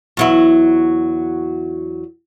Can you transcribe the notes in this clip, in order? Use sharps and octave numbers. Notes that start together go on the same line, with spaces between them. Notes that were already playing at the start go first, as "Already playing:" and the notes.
E2 F#3 E4